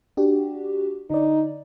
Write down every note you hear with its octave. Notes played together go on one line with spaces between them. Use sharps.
D4 F#4 G4
D3 D#4 D5